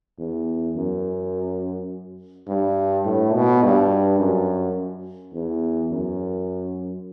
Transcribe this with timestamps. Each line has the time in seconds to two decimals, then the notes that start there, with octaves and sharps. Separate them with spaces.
0.18 E2
0.76 F#2
2.48 G2
3.05 A2
3.34 B2
3.63 G2
4.19 F#2
5.34 E2
5.91 F#2